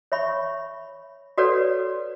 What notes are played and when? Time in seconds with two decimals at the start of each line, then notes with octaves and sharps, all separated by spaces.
0.12 C#5 E5 B5 C#6
1.38 F#4 A4 B4 C#5 D5 F#5